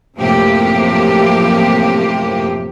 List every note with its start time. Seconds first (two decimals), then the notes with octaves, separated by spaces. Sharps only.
0.17 F#2 A2 C3 F3 A#3 G4